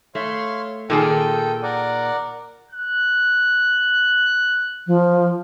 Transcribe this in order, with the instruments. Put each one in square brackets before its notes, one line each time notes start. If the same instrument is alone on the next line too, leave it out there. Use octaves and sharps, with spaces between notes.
[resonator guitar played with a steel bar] A3 [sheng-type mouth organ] C#5 F5 C6
[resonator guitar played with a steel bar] A#2 D#3 G#4 [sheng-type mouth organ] A4 G5
[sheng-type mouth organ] A#4 D5 F#5
[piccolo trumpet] F#6
[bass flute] F3